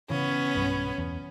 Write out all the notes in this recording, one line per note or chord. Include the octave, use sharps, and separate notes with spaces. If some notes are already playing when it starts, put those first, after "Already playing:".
C#3 E3 B3 C#4
B1 G2
E2